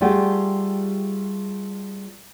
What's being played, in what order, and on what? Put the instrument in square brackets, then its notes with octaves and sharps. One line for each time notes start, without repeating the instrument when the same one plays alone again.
[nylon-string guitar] G3 A3 F4 G4 G#4 F#5